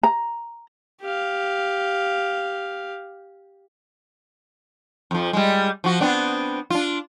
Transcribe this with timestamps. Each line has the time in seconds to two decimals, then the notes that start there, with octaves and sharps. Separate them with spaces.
0.03 A#5
1.01 G4 F5
5.11 F2 F3
5.33 G3 G#3
5.84 F3 F#4
6.01 B3 C4 D4
6.70 D4 F4